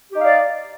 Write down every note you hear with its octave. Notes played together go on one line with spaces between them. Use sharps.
D#4 G4 D5 F5